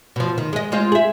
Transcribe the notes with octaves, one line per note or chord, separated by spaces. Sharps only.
B2 F3
D#3
G#3 D#5
G#3 C4 F4
G#4 E5